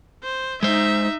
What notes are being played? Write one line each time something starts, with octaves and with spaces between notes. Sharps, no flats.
C5
G#3 D#4 C5 E5